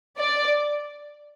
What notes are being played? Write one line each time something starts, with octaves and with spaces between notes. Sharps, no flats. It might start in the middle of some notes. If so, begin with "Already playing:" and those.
D5